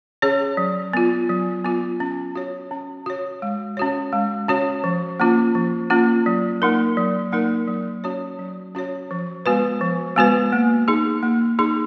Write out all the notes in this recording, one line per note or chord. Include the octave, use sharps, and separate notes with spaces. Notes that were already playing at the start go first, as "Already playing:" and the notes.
C#4 G#4 C#5
F#3
B3 F4
F#3
B3 F4
C#4
F#4 C#5
C#4
F#4 C#5
G#3
C#4 F#4 C#5
G#3
C#4 F#4 C#5
F3
A#3 C#4 F4
F3
A#3 C#4 F4
F#3
A#3 D#4 A#4
F#3
A#3 D#4 A#4
F#3
C#4 F#4 C#5
F#3
C#4 F#4 C#5
F3
G#3 B3 F#4 B4
F3
G#3 B3 F#4 B4
A#3
D#4 G#4
A#3
D#4 G#4